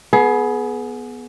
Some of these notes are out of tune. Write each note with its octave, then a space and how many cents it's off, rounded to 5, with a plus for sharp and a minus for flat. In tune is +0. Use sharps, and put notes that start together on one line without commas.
B3 -10 G#4 +25